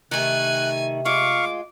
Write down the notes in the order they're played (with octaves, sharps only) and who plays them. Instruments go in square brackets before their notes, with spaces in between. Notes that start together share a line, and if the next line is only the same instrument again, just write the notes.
[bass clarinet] C3 [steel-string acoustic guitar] D#3 A3 [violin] G#5 [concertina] F#6
[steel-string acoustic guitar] G#3 F4 [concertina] F5 C#6 [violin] D6